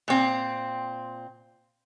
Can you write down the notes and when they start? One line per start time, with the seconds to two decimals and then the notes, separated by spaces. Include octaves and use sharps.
0.08 A#2 C4